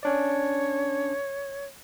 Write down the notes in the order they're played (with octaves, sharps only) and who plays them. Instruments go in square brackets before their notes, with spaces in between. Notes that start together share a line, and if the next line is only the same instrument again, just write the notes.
[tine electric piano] C#4 D4 D5 [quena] C#5